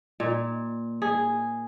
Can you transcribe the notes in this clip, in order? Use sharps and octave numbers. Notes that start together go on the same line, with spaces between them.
A#2
G#4